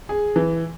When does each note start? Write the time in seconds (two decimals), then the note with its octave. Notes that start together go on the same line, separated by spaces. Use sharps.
0.09 G#4
0.36 E3